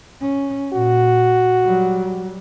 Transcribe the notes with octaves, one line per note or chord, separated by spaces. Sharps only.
C#4
A#2 F#4
F#3 G3